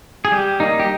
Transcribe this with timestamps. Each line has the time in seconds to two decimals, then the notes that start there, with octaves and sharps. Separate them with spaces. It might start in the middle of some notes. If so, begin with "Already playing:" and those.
0.25 G#4
0.32 G3 G4
0.60 A#3 D#4
0.80 G4